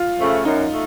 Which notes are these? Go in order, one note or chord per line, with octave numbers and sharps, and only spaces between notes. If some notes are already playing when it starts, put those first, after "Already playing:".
Already playing: F4
C#3 F3 A3
F#2 D#4
A3